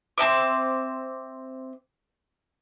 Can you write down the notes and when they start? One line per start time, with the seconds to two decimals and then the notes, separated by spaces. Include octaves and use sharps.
0.18 C4 D#4 E5 D6